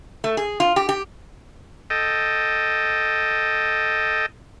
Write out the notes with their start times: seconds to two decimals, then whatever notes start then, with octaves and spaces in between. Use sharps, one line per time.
0.24 A3
0.37 G#4
0.60 F4
0.76 G4
0.89 G4
1.90 A4 D#5 G5